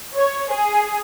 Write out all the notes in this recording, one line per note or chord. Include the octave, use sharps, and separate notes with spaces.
C#5
G#4